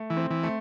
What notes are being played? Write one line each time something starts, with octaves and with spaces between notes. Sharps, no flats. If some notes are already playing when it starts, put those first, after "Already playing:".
Already playing: A3
E3
C4
E3
A3